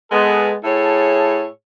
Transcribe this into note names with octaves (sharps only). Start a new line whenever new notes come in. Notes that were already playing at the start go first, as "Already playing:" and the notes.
G#3 B3 A4
A2 G#4 C#5 E5 A5